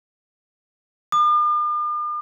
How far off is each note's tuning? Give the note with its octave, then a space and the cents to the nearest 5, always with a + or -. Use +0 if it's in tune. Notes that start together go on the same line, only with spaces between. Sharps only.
D6 +45